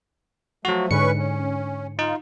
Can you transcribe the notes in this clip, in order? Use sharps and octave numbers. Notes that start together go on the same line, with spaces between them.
F3 F#3 A3 F#4
G#2 D3 C#4 B4 C#6 C#7
C#4
D#4 F4